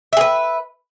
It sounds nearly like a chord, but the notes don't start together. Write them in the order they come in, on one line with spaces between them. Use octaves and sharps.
E5 G#4 B4